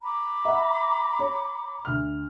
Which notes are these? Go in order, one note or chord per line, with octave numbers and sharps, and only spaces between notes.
A#5 B5 D6
E5 F#5
C#5
D2 F6